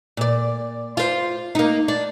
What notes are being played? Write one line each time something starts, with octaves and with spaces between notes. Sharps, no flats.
A#2 D5
F4 C5
A#3 D#4
D4